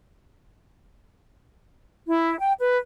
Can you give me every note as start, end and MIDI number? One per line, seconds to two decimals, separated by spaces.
2.07 2.38 64
2.39 2.51 79
2.58 2.76 71